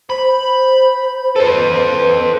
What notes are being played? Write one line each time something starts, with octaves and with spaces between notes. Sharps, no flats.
C5 B5
A4 B4 C5